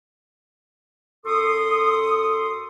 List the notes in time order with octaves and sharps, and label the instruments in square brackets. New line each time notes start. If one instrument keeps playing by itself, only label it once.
[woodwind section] F#2 A4 C6 C#6 D#6